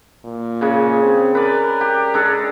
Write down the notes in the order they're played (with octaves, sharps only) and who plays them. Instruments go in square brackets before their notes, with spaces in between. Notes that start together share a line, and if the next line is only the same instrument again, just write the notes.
[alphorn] A#2
[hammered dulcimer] C#3 G#3
[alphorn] C4
[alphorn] A#4 [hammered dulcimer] B4 D5
[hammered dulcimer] G4
G#3 D4 A4